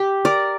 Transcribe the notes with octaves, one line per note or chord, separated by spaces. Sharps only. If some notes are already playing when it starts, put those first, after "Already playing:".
Already playing: G4
A#4 D5